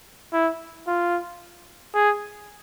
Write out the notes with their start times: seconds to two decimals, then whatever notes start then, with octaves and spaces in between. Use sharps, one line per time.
0.33 E4
0.87 F4
1.94 G#4